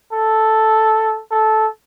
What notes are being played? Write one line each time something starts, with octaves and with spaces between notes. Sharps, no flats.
A4
A4